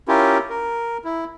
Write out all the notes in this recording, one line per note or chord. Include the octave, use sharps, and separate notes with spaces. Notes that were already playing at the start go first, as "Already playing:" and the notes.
C#4 E4 F4 G4 A#4
A#4
E4